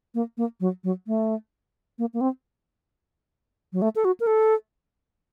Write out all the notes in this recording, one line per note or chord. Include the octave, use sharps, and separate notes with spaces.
A#3
A#3
F#3
F#3
A3
A#3
A#3
C4
F#3
A3
A4
F#4
A#4
A4